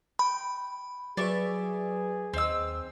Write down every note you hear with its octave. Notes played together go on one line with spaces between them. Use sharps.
G5 B5
F#3 G#4 B4 D5 E5 C#6
D#2 C4 D#5 E6